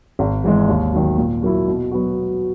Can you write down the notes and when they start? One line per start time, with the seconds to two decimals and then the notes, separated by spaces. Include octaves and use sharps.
0.19 G#1
0.44 G#2 E3 G#3
0.69 D#2
0.93 D#3 F#3
1.18 A#2
1.43 F#3 A#3 E4
1.68 B2
1.91 F#3 B3 F#4